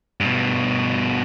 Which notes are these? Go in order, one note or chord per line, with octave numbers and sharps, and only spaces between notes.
G2 B2